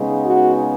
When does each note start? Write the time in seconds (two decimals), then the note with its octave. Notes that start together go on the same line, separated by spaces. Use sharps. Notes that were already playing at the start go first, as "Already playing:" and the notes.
Already playing: C#3 G#3 B3 D#4
0.24 F#4